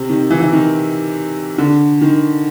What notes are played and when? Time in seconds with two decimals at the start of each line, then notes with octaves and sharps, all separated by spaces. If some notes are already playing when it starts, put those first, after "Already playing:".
Already playing: C3
0.10 D#3
0.30 E3
0.41 E3
0.53 D#3
1.58 D3
2.01 D#3